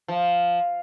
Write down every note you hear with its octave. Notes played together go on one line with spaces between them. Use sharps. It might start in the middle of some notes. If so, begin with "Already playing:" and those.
F3